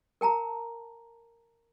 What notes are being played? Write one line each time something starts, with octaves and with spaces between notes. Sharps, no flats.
A#4 G5 A5 A#5